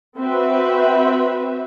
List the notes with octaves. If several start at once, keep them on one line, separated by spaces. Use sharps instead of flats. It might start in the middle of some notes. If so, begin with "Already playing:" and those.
C4 F#4 B4 E5